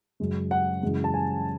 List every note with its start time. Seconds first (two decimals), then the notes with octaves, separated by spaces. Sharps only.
0.20 F#2 C#3 G#3
0.51 F#5
0.83 F#2 C#3 E3 G#3
1.04 A5
1.14 G#5